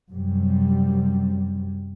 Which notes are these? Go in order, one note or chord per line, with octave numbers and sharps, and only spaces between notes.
F#2 C3 G3